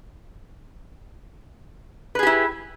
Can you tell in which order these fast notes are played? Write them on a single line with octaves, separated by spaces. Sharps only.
B4 G#4 G4 E4